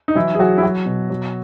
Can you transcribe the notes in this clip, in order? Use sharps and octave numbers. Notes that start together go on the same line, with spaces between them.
D#4
E3 F#3 E4
G#4
F#3 F#4
E4
F#3 F#4
B2
F#3